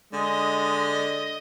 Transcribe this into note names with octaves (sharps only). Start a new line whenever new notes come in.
D3 G#3 D#5